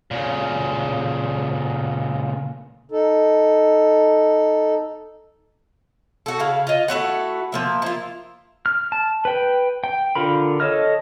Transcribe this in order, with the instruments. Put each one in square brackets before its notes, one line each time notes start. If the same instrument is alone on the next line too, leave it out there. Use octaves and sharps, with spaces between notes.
[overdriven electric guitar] A#2 C#3
[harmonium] D#4 A4
[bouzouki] F#4 A4
C#3 E4 F5
F4 D#5
A3 E4 F#4 F#5
F3 A#3 E5
E4 F4
[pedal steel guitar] F6
A5
B4 G5
G5
D3 F4 A#4 B5
A4 C#5 D#5 F6